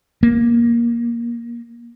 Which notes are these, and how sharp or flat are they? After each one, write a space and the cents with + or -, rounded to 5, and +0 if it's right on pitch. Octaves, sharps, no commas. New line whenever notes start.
A#3 +15